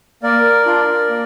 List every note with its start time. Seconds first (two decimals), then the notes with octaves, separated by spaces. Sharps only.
0.23 A#3 A#4 D5
0.66 D4 F4
1.09 A#3